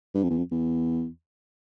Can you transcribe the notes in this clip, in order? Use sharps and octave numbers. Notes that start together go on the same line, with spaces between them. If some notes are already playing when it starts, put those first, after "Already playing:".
G2
F2
E2
F2
E2